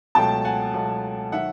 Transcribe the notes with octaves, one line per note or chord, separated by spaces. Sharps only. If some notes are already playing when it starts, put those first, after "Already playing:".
C#2 B2 F#3 A3 G5 A5
F#5 G#5
C#2 B2 F#3 A3
D#3 F#3 E5 F#5